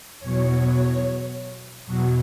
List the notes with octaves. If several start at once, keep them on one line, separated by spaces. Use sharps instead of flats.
E2 B2 F#3 C#5
E2 B2 F#3